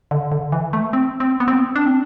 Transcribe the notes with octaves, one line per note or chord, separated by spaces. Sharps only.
D3
D3
E3
A3
C4
C4
B3
C4
D4
C4